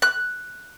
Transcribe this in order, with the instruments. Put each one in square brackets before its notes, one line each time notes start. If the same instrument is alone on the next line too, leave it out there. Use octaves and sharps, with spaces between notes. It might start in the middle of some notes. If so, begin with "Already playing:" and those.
[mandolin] F#6